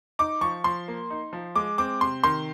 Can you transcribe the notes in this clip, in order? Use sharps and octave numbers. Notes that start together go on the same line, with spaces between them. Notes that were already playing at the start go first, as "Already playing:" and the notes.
D#4 D6
F3 C#6
F3 C6
A#3
D#4
F3
G#3 D6
C4 D6
C3 C6
D#3 C6